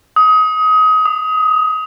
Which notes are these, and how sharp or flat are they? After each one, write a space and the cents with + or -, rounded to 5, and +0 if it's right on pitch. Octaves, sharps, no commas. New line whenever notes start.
D#6 +25
D#6 -25